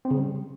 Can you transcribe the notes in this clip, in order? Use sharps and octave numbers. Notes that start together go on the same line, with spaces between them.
C4
C#3
G3